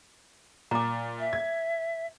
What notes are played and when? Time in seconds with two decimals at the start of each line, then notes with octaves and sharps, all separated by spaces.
0.71 A#2 A#5 D6
1.19 E5
1.33 G#6